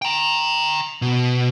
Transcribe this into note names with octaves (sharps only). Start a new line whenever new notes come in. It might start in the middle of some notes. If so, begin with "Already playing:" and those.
G5 A#5
B2